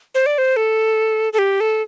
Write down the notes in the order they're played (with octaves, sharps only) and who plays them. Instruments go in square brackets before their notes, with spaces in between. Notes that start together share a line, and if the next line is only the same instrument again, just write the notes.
[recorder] C5
D5
C5
A4
A4
G4
A4